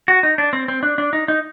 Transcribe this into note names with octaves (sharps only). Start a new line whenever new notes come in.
F#4
D#4
D4
C4
C4
D4
D4
D#4
D#4